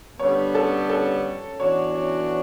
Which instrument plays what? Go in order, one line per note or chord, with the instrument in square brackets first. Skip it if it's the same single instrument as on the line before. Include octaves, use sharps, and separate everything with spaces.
[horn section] D3 G3 B3 [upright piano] C#5
[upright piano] A4
A4
[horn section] E3 B3 D4 F#4 [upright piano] C#5
[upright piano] D5